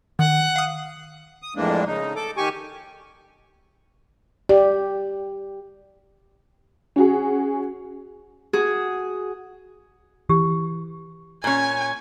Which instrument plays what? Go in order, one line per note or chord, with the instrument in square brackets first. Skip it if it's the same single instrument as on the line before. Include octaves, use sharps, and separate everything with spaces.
[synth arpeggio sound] D#3 [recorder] F#5
[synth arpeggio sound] F5 D#6
[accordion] D#6
F2 A2 E3 G#3 A#3 D4
C#3 D#4
A4 D6
D#3 G4 G#5 C#6
[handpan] G4 [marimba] D5
[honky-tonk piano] C#4 F#4 G#4
[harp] F#4 G#4
[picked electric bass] E3 [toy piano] G4
[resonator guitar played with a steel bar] A#2 C#4 [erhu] G#5